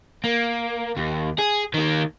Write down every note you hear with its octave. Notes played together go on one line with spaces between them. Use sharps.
A#3
D#2
G#4
D#3 A#3